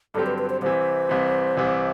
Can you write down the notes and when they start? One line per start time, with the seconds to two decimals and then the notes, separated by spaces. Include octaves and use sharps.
0.14 G2 D3 F#3 C4 G4 A4
0.26 B4
0.38 B4
0.50 C5
0.61 C2 C3 E3 C5
1.09 C2 C3 E3
1.57 C2 C3 E3